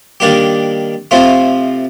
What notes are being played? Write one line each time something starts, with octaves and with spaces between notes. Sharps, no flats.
D#3 G3 A#3 D4 G4
C3 F3 A3 C4 F4